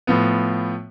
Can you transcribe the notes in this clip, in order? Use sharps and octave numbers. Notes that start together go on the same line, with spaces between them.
A2 F3 B3